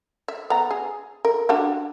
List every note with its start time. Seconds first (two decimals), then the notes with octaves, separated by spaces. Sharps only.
0.28 E5
0.50 B3 A#5
0.71 G#4
1.25 A#4
1.49 D4 F#4 G4